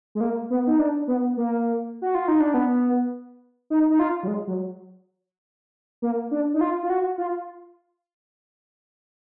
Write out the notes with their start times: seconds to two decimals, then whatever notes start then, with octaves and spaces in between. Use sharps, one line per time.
0.15 G#3
0.21 A#3
0.50 B3
0.67 D#4
0.79 D4
1.08 B3
1.37 A#3
2.02 F#4
2.15 F4
2.28 D#4
2.40 D4
2.54 B3
3.70 D#4
3.90 D#4
3.99 F4
4.23 F#3
4.27 G#3
4.47 F#3
6.02 A#3
6.31 D4
6.54 D#4
6.61 F4
6.83 F4
6.90 F#4
7.18 F4